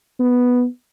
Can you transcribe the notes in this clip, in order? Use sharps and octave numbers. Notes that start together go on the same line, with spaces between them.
B3